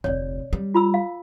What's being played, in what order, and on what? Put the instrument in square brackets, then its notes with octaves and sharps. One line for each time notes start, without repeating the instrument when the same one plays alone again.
[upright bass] F1 D2 [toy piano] C#5 D5
[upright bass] G3
[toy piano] F4 B5 E6
F5